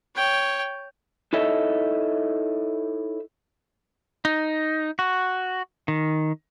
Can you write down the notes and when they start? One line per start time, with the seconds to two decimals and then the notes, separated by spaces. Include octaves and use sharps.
0.16 C#5 G5
1.33 D#4 E4 A4 C#5 D#5 E5
4.25 D#4
4.99 F#4
5.88 D#3